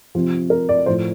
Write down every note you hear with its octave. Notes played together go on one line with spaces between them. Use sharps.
C3 F3
A#4
D5
A2 F3 C5